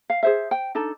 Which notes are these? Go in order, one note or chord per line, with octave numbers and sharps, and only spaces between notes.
F5
G#4 C5 E5
G5
D4 D#4 A4